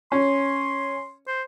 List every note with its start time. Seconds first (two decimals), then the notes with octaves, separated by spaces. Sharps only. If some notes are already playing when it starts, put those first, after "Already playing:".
0.12 C#4 C6
1.27 C5